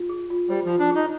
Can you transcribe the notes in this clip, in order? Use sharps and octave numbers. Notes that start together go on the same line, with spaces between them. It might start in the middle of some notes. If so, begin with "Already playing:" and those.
Already playing: F4
G#4
F4
G3 C5
F3 F4
D4
G#4
D#4